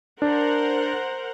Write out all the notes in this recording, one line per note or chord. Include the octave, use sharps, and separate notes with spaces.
D4 A#4 C5 F#5